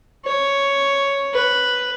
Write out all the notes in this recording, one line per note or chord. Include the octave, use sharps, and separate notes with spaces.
C#5
B4